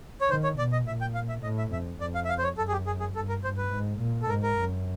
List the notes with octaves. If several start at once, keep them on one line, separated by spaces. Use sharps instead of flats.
C#5
D#3 C5
C#5
B2 D5
D#5
A#2 E5
G5
F5
E5
A2 D#5
E5
F2 E5
F2 D5
F5
E5
F5
C5
C#5
F#2 A4
G#4
G4
G#4
G#4
G2 A4
A#4
G2 C5
B4
G#2
A#2
A4
G#2 A#4
A#4
F#2